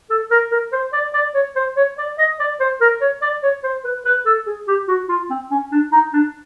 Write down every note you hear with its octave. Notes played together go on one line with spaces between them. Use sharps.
A4
A#4
A#4
C5
D5
D5
C#5
C5
C#5
D5
D#5
D5
C5
A#4
C#5
D5
C#5
C5
B4
B4
A4
G#4
G4
F#4
F4
C4
C#4
D4
D#4
D4